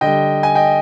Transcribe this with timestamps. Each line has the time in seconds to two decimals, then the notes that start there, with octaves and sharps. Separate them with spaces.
0.01 D3 G3 D#5 G5
0.43 G#5
0.55 D#5 G5